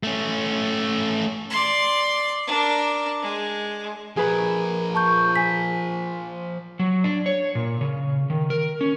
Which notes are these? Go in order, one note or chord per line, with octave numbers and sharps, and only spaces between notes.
A3 C#4
D5 C6
D4 A#4
G#3
F3 G#4 A#4 B4 B5
A5 C#6 G6
G#5 B6
F#3
D4
C#5
A#2
C#3
D#3
A#4
C#4